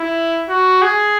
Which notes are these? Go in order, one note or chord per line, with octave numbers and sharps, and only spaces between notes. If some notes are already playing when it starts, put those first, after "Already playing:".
Already playing: E4
F#4
G#4